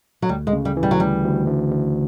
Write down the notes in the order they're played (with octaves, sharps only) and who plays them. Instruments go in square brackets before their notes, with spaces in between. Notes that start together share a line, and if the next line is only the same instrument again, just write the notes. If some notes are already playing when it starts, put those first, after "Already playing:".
[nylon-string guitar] F#3
[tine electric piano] D2 [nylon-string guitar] G3
[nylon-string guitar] G#3
[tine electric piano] C#3
[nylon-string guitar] G3
[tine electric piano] E3
[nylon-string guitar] G3
F#3
[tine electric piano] D2 [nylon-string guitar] G3
[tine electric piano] D2
D2
D2